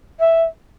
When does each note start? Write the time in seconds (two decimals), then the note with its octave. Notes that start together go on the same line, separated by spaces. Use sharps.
0.19 E5